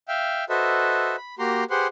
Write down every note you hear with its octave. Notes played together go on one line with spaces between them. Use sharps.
E5 F5 G5
F#4 A4 B4 C5 D#5 E5
B5
A#3 F#4 G4 A#5 C6
G4 G#4 B4 C5 F#5 C6